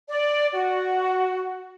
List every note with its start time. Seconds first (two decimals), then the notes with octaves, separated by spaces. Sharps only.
0.09 D5
0.53 F#4